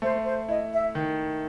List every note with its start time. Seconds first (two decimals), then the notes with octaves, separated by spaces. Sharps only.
0.02 A3 C5
0.26 C5
0.49 E4 D#5
0.73 E5
0.95 D#3